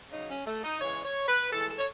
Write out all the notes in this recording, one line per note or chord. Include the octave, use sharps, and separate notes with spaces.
C#3 F#3 D#4
C#4
A3
D#4
C#3 E3 G#3 C#5
C#5
B4
A2 E3 G#3 A4
A4
C#5